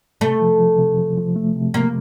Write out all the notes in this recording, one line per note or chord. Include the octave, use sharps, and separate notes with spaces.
C3 A3
F3
F3
C3
F3
F3
A3
C3
C3 A#3